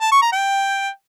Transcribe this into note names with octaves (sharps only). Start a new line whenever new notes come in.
A5
C#6
A#5
G5